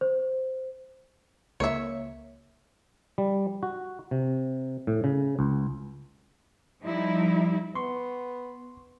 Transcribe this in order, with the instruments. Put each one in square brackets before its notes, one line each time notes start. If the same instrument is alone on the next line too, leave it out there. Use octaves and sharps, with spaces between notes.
[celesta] C5
[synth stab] C#2 A#3 [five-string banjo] C#5 E5
[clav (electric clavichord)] G3
F#4
C3
A2
C#3
C#2
[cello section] F3 G3 D#4 E4
[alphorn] B3 [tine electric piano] C6 C#6